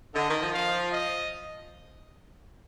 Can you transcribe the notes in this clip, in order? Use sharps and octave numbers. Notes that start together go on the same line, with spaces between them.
D3 D#5
D#3
F3
F5
D#5